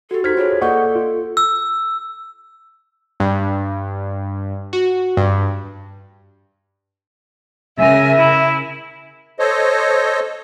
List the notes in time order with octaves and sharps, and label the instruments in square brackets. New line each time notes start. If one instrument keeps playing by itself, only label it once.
[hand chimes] F#4 G4 [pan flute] A4
[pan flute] D#4 [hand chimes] C5 G#6 [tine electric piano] F6 B6
[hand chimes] F4 G#4 A4 [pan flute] C#5
[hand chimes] A#3 D5 G6 [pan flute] A4 [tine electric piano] D#5 F#5 C#6
[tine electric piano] F4
[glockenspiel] E6
[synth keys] G2
F#4
G2
[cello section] C#3 A#4 [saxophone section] E5 [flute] G#5
[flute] E4
[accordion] A4 C5 C#5 D#5